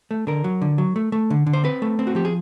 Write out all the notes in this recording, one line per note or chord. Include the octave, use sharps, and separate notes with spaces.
A3
D3 A#4
F#3
D3
F#3
A3
A3
D3
D3
C5
C4 B4
A3
C4
F#4
F3 G4
G#4